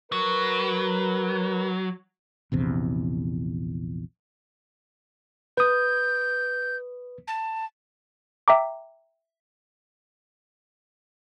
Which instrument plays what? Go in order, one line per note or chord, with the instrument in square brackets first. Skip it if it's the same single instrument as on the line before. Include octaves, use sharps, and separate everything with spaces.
[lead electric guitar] F#3 [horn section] A#4 B4
[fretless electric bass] A#1 E2 C3
[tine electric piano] B4 D#6 [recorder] G6
[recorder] A5
[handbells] E5 G5 A#5 D6